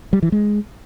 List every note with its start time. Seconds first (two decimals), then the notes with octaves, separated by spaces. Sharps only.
0.13 G3
0.23 E3
0.32 G#3